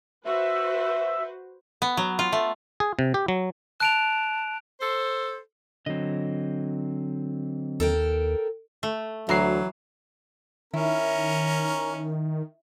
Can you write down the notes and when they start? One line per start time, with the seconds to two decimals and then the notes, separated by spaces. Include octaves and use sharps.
0.25 F#4 B4 C5 E5
1.82 B3
1.97 F#3
2.19 F4
2.32 A3
2.80 G#4
2.99 C3
3.14 G4
3.28 F#3
3.80 A5 F#6 D7 F7
4.81 A4 C5
5.86 D3 F#3 C4 D#5
7.80 D#2 A4 A#4 G5
8.83 A3
9.29 D2 E3 F#3 E5 A#5 C7
10.74 D#3 C#4 E4 A#4